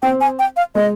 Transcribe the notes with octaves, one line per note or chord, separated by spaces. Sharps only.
C4 G5
G#5
G5
F5
G#3 D#5